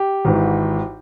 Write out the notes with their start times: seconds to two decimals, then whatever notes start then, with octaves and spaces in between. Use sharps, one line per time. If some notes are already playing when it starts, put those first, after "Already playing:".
Already playing: G4
0.25 G#1 G#2 E3